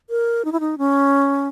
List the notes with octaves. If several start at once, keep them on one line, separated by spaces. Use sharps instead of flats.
A#4
D#4
E4
D#4
C#4